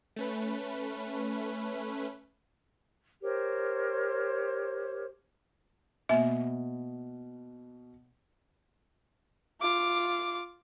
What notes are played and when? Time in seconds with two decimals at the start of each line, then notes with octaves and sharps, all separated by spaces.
0.16 A3 C#4 B4
3.22 G4 A#4 C5 C#5
6.09 B2 A#3 E5
9.61 F4 D6